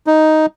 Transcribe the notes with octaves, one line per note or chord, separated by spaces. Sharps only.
D#4